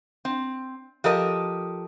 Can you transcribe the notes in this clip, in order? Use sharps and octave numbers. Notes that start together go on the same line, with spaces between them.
C4
F3 G4 A4 A#4 D#5